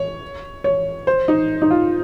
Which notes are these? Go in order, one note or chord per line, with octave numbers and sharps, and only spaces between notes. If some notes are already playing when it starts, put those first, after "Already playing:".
Already playing: C#5
C#5
C5
D#4
D#4
F4